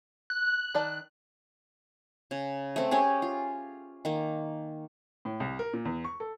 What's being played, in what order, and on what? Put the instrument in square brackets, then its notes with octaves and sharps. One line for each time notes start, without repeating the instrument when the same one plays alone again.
[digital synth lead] F#6
[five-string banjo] D#3 D5 A5 [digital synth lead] F#6
[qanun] C#3
A3 C4
C#4 G4 G#4
F4
D#3 A#3
[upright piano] A2
C2
A#4
A#2
E2
C#6
A4